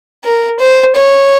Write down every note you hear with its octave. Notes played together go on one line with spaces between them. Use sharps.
A#4
C5
C#5